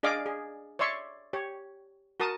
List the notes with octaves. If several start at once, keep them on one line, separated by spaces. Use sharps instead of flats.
D4 G#4 D5 D#5 F5 D6
G#4
C#5 D5 E5 C6 C#6
G4 C#5
F#4 A#4 A5 D#6